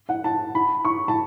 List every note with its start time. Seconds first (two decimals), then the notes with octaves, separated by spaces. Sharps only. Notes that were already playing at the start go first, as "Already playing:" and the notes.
0.09 F#5
0.24 A5
0.55 B5
0.85 C#6
1.08 A5